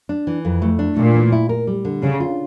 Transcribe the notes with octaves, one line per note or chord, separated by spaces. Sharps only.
D4
E3
F2
A3
D4
A#2 A3
E3
E4
A#4
G3
D3
C#3 D4
F4